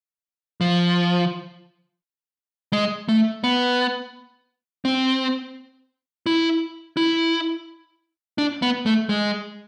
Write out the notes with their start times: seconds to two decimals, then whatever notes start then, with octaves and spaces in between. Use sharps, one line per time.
0.61 F3
2.73 G#3
3.09 A3
3.44 B3
4.85 C4
6.26 E4
6.97 E4
8.38 D4
8.62 B3
8.86 A3
9.09 G#3